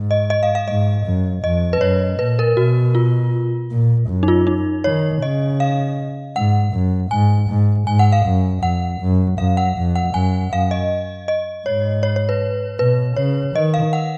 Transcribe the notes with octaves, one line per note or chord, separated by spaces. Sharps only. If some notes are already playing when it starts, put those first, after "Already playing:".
Already playing: G#2
D#5
D#5
F5
F5
G#2 D#5
F#2
F2 D#5
B4
F#2 C#5
A#2 B4
A#4
B2 F#4
F4
A#2
F#2
D#4
F4
D#4
D#3 C#5
C#3 D#5
F5
G#2 F#5
F#2
G#2 G#5
G#2
G#2 G#5
F#5
F5
F#2
F2 F#5
F#2
F#2 F5
F#5
F2
F#5
F#2 G#5
F#2 F5
D#5
D#5
G#2 C#5
C#5
C#5
B4
B2 B4
C#3 C#5
D#3 D#5
F5
F#5